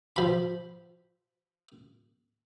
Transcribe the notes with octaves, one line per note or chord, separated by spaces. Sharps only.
F3 B5